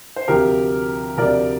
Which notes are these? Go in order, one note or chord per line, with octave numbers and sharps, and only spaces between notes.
C5
D2 C3 F3 G4 A#4
D2 C3 F3 A#4 D5